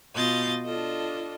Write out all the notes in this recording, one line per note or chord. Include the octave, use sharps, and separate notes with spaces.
B2 F4 D#5 G6 A6
D4 F4 A4 D#5